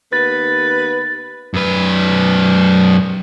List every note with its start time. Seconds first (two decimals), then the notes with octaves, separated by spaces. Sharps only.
0.13 D#2 B3 B4 A6
1.54 F#2 B4